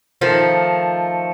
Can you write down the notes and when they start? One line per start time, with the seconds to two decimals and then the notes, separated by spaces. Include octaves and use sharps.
0.21 D#3 F3 A3